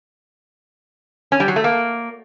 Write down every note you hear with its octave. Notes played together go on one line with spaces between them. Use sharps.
C#4
G3
F#3
A3
A#3